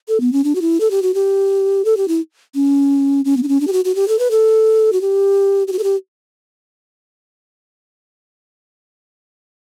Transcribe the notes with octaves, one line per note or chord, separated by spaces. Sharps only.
A4
B3
C#4
D4
F#4
E4
A4
G4
F#4
G4
A4
G4
E4
C#4
C#4
B3
D4
C#4
D4
G4
F#4
F#4
G4
A4
B4
A4
F#4
G4
G4
F#4
A4
G4